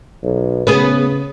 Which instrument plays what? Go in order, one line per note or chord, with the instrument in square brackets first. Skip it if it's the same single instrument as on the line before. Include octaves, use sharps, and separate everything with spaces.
[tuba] B1
[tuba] C#3 [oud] B3 G#4 B4